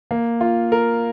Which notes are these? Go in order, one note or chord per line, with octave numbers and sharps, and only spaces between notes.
A#3
F4
A#4